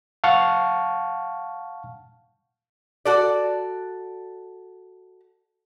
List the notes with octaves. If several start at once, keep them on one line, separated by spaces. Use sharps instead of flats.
F5 F#5 A5 C#6 F6
F#4 A4 D5